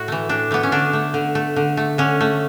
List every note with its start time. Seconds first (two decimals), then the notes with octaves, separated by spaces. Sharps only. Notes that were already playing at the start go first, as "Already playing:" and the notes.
Already playing: A2 F#4
0.08 E3 A3
0.29 A2 D4
0.51 E3 A3 B3
0.63 C#4
0.72 D3 D4
0.93 A3
1.14 D3
1.35 A3
1.56 D3
1.77 A3
1.98 D3 C#4
2.21 A3